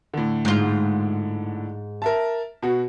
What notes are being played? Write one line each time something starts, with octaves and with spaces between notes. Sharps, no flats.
A2 D3
G#2 F4
A#4 E5 A5
B2 F#4